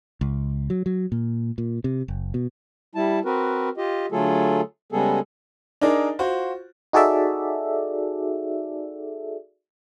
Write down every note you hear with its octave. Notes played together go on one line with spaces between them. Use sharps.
C#2
F#3
F#3
A#2
A#2
C3
F#1
B2
G3 E4 A5
C4 F#4 A#4 B4
F4 G4 D#5
D3 F#3 A3 F4 G#4 A4
C#3 G3 G#3 B3 G#4 A4
D4 D#4 G#4 A#4 D5
F4 F#4 C5
D#4 F#4 G#4 A4 D5 E5